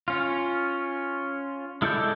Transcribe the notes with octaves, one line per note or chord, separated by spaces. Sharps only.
C#4 F4
G#3 E4 A4 D5 G6